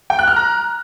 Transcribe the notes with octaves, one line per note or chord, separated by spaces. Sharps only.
G5
F#6
F6
A#5